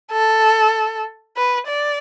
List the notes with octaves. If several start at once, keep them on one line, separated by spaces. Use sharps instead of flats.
A4
B4
D5